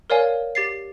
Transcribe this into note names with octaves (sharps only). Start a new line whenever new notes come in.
A#4 C#5 D5 F5 G#5
G4 A6 C7